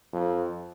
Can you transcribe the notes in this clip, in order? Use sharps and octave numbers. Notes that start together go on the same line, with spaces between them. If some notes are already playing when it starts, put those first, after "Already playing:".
F2